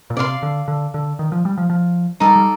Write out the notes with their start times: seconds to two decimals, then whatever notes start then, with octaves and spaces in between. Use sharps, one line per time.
0.10 A#2
0.17 C3 D5 F5 C6
0.42 D3
0.68 D3
0.94 D3
1.19 D#3
1.32 F3
1.45 G3
1.58 F3
1.70 F3
2.20 G3 D#4 A4 D5
2.36 G3